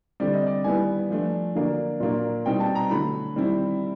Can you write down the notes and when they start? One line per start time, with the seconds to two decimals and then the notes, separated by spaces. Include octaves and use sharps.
0.20 D3 G3 C4 D5
0.34 D#5
0.47 D5
0.64 D#3 G3 B3 E4 G#5
1.10 F3 A3 D4
1.55 D3 F#3 A#3 D4
2.00 A#2 F#3 A#3 D4
2.46 B2 G3 C4 D#4 G5
2.60 A5
2.75 A#5
2.90 D3 F#3 A3 B5
3.36 D#3 G3 C4 E4